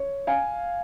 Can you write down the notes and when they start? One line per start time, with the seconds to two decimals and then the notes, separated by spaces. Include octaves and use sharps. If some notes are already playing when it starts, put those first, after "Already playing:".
Already playing: C#5
0.27 F5 G#5